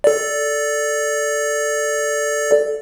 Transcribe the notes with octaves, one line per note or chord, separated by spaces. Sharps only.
A4 D5